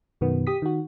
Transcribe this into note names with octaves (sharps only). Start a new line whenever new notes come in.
F#2 B2 D#3 B3
G4 D#6 B6
D#3 F#4